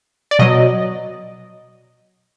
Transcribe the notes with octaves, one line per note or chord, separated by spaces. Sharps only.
D5
B2 F#3 D#5